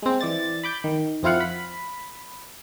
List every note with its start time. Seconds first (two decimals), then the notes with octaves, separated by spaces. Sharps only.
0.02 G#3 C4
0.21 E3 D5 A6
0.64 B5 D6 G6
0.84 D#3
1.23 F2 C4 E4 F4 F5 F#5
1.40 B5